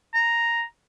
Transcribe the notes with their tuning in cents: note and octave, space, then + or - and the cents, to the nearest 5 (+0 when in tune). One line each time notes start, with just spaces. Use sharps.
A#5 +0